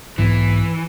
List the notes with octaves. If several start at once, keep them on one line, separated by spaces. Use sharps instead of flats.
B1 G#2 E3 B3